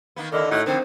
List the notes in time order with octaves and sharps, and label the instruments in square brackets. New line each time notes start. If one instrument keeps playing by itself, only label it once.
[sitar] D#3 A#3 B3
[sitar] D#2 E4 [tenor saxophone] D3 [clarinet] A#4 [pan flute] D#5
[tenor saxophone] A2 [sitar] D#4 F#4 [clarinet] F#5
[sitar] F2 D3 [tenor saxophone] D#3 [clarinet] C4 [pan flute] C5